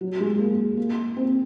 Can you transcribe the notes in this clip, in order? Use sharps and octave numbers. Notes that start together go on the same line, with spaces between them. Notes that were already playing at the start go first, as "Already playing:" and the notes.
F#3
G#3
A#3
A#3
C4